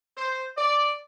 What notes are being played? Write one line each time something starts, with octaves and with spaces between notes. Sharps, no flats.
C5
D5